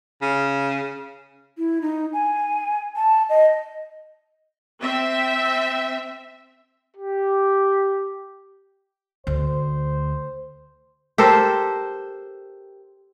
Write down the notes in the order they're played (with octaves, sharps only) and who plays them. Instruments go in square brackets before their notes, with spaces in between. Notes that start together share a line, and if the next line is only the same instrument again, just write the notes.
[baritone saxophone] C#3
[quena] E4
D#4
G#5
A5
D#5
[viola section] C4 E5
[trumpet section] G4
[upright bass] D2 [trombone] C5
[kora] G4 A4 A#4 C5